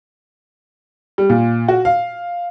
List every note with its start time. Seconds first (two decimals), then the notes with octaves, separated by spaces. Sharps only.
1.18 G3
1.30 A#2
1.69 F#4
1.85 F5